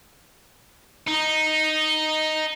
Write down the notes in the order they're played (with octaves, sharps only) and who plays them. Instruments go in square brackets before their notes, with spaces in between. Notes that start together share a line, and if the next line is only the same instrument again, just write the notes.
[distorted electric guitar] D#4